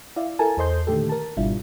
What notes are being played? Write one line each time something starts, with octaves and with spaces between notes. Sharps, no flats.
E4 D5 E5 F5
E4 A4 A#4 G#5 A5
E2 A4 C5 D#5 C6 G6
A#2 D3 D#3 A3 G4 A4
A#4 A5
G#1 B2 G3 D4 E4 F4